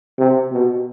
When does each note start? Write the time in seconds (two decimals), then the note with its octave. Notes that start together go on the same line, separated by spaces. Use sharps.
0.18 C3
0.52 B2